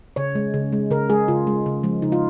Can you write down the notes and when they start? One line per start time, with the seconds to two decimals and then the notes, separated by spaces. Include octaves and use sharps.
0.16 C#3 C#5
0.35 G#3
0.54 C#3
0.72 G#3
0.91 C#3 A#4
1.10 G#3 G#4
1.28 C#3 F4
1.47 G#3
1.66 C#3
1.83 F3 G#3
2.02 C#3 D#4
2.12 F4